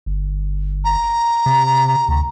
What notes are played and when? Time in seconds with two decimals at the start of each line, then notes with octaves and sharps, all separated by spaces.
0.06 G1
0.84 A#5
1.46 C3
2.08 D2